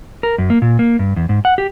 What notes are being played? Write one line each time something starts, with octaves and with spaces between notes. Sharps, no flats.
A#4
F#2
A#3
A#2
A#3
G2
E2
G#2
F#5
G4